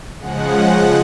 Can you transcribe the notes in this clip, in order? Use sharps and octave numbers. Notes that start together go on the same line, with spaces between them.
C#3 F3 G#3 F#5